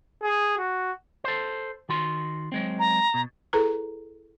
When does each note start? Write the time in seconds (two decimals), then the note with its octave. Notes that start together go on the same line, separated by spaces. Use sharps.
0.23 G#4
0.57 F#4
1.24 A4 C5
1.89 D#3 F#4 C6
2.52 F#3 G#3 C4
2.79 A#5
3.14 B2
3.53 E4 G#4 A4 B4 A#5